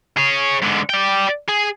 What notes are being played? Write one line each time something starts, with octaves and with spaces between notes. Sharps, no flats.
G#4 C#5
G#2 D3
D5 G5
G#4